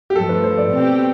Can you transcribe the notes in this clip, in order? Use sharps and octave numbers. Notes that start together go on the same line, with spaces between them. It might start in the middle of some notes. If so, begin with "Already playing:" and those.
G4
G2 F3 A3 A4
B4
C5
D5
B2 G3 C4 G4